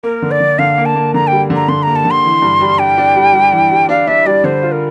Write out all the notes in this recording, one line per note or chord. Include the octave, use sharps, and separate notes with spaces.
A#3 A#4
D3
D5
D3
D3 F5
A#3
A5
A#3
D3 A#5
G3 G5
D3
A#5
D3 C6
A#3 A#5
A5
D3
C6
E3
G2
G3
D4 G5
D4
G3
G3
E3
G3
D4 F5
D4 E5
G3 D5
D3 C5
F4
A#4